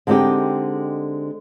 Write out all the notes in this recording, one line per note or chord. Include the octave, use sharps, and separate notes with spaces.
D3 G#3 C4 D#4 G4